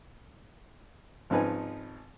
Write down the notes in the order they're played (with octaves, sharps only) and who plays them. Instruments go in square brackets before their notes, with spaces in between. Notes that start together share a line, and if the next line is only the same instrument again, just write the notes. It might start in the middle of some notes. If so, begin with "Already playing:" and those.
[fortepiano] G#1 C#3 F3 D#4 B4 G#5